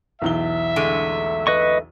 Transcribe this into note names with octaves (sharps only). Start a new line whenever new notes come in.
B1 E2 E5 G7
D3 G#3 A3
B4 D#5 C#6